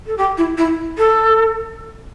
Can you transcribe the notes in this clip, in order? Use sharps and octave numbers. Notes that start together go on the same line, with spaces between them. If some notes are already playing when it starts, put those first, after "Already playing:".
A4
G4
E4
E4
A4